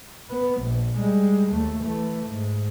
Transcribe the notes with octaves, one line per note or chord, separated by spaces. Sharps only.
B3
A#1
G3 G#3
D#2 A3
E3 A3
G#2